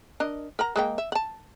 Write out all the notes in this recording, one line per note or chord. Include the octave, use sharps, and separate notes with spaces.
D4 A#4 D#5
A#4 F#5 A#5
G#3 A#3 G5
E5
F#5 A5